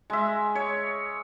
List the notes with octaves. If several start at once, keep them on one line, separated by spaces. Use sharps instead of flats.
G#3 E5
C#5